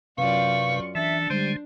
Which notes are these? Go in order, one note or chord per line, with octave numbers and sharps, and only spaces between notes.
F#2 C3 F4 B4 D5 F5 C#6
E3 D4 A4 E5
D3 G3 G#3 C5